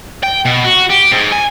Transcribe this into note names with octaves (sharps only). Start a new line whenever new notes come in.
G5
B2
F#4
G4
G#2
G#5